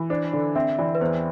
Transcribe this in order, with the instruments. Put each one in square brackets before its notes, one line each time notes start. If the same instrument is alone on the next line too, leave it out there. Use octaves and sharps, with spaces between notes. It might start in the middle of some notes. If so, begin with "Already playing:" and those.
Already playing: [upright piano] E3
[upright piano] D4 [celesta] C5
[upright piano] D3 [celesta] D5
[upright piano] C4 [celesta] E5
[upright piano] E3 [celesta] D5
[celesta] B4
[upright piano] E2 [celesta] C5